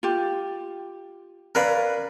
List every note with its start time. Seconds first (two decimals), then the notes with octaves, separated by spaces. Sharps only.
0.03 F4 G4
1.55 C#4 A#4 B4 D5 F5 B5